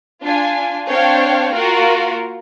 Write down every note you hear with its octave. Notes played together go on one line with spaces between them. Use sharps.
D4 F4 G#5
C4 D4 C5 C#5 F5 G5
A#3 F4 F#4 A#4